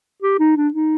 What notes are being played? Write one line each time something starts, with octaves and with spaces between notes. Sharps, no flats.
G4
D#4
D4
D#4